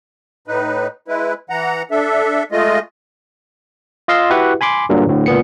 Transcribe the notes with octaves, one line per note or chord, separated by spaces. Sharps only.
A2 D#4 B4
G#3 E4 B4
E3 F#5 A#5
D4 A4 E5
G#3 A3 F4 D#5
F4 D#5 F5 C6 E6
E4 F#4 G4 B4 E5 F#5
G#5 B5 C6 D6
G2 A#2 D3 F#3
D2 A2 D3
C#2 A#2 B3 C#7